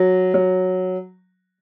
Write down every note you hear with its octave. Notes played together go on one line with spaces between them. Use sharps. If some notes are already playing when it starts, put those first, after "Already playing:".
Already playing: F#3
F#3